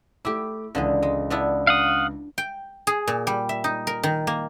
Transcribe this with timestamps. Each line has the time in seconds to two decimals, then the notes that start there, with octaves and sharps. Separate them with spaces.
0.25 A3 E4 G4 D6
0.75 C#2 D3 E3 G#4
1.03 G#3
1.30 B3 D4 E4
1.67 F5 F#5 D#6
2.38 G5
2.87 G#4
3.07 A#2
3.27 G3
3.49 E5
3.64 D#4
3.87 A#4
4.03 D#3
4.27 A#3